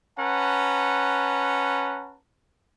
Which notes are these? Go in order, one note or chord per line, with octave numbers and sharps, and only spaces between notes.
C#4 B4 F#5 A5 A#5